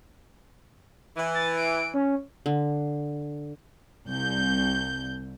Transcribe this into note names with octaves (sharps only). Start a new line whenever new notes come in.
E3
A6
D7
C#4
D3
C2 G6